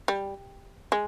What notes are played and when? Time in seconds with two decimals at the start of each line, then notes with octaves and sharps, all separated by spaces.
0.08 G3
0.92 G#3